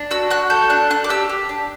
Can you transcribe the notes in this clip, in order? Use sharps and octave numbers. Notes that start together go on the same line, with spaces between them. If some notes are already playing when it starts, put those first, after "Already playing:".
Already playing: D4
F#4 E6
F#4 F#6
A4 G6
D4 F#6
D4 F#6
D6
G4 E6
G4
D4